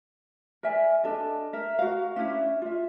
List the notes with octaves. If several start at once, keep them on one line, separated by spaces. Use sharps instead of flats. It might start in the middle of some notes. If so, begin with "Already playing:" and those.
A#4 D5 E5 G#5
D4 A4 D#5
A#4 E5
F#4 A#4 F5
C#4 D4 E4 E5
F4 E5